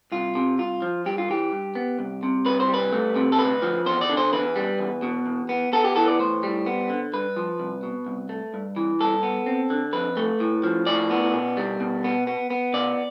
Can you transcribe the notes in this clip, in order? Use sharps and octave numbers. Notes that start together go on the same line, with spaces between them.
C2 F4
C3
C2 F4
F3
G2 G4
F4
E3 G4
G2
B3
C2
C3
C2 B4
C5
G3
B4
A3
C3
A4
D2 B4
F3
E2 C5
D5
D3
C5
E2 B4
G3
E2
B2
E2
B3
B3 A4
G4
E3 A4
D5
A2 C5
G3
B3
D3
G2 B4
F3
C2
B2
C2
A3
G2
E3
G2 A4
B3
C4
D3
F2 B4
A3
A2
F3
A2 D5
B3
B2
G3
B2
B3
B3
B3
B2 D5